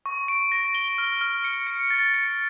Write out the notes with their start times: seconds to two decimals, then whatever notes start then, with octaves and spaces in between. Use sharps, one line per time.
0.06 C#6
0.28 D7
0.52 A#6
0.75 G7
0.98 F6
1.21 F6
1.44 C#7
1.67 C#7
1.90 A6
2.14 C#7